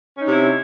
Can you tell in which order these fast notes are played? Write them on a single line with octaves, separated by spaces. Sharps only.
C#4 D#4 C3 E4